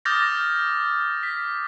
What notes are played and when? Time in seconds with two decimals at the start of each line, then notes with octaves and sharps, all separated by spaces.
0.05 D6 D#6 F6 G6 A6 A#6
1.23 B6